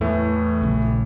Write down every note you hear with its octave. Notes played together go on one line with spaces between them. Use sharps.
E2 A2 E3 A3
A#1 C#3